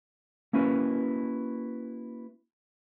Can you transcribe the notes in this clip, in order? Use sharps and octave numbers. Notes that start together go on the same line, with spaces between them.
A#3 C#4 E4 F#4 B4